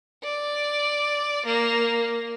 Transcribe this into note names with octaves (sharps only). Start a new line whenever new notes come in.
D5
A#3